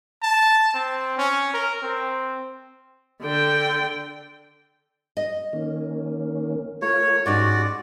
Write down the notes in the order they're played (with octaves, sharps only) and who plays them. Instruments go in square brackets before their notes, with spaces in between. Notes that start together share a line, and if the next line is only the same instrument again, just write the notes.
[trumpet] A5
C4
C#4
A#4
C4
[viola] D3 G5
[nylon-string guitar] D#5
[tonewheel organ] D#3 A#3 C#4
[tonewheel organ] A3 F4 A#4 [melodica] C#5
[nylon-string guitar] G#2 C#4 D#4 [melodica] F#4 D5 [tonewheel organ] G4